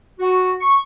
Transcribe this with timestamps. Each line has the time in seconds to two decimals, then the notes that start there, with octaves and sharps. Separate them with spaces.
0.19 F#4
0.61 C#6